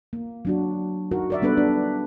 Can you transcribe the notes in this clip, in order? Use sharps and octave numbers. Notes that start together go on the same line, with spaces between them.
A#3
F#3 D4 F#4
D#4 F#4 A#4
A#4 D5 E5
G3 B3 D4 A4 B4
D4